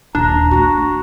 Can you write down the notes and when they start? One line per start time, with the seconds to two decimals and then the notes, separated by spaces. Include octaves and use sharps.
0.15 D#1 D#2 D4 A#5
0.51 A3 B3 F#4